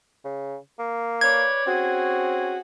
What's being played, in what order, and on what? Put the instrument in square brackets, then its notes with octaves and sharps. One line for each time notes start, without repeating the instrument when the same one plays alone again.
[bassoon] C#3
A#3
[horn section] B4 C#5 D5 [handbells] G#6
[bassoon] C4 [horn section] C#4 F#4 G#4